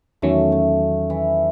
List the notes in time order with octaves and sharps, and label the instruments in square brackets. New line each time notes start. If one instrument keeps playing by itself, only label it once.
[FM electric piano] E2 D#3 F#3 C#4 [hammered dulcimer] A3
[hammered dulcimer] A3
E3